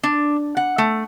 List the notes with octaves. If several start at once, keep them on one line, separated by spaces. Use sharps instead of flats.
D4
F#5
A3